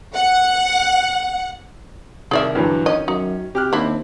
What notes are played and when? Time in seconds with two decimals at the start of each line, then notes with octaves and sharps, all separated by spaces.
0.15 F#5
2.31 C2 D#3 G#4 A#4 D5 E5
2.55 G2 D3 E3 F#3
2.86 D#3 C#4 D#5
3.08 F#2 D#4
3.55 C3 G4 F6 F#6
3.73 D#2 C4 D4 E4